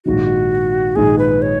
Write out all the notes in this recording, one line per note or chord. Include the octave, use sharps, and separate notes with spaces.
A#1 G#2 D#3 F#4
A#1 G#2 D#3 G#4
B4
C#5